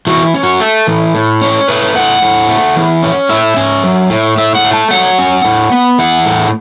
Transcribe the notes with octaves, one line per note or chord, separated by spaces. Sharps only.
E3 F#4
C#4
F#4
A3 A4
E3
A2
C#4
A3 B4
A2 F#5
A2
A3
E3
C#4
A2 E5
C#4
F#3
A2
A2 E5
F#5
A3
A5
F#3 F#5
C#4
A2
B3
E3 F#5
A2